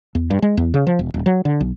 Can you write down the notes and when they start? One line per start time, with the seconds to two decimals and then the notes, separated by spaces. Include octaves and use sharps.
0.15 E2
0.30 G2
0.42 G#3
0.57 E2
0.74 C#3
0.87 F3
0.99 E1
1.14 D#1
1.26 F#3
1.45 D3
1.61 B1